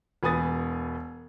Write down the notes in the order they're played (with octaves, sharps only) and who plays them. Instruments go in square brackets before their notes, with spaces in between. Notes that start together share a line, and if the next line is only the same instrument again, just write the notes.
[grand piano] E1 B3 G#5 D#6 A6